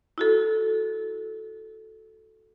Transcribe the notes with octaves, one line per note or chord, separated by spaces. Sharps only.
E4 F#4 A4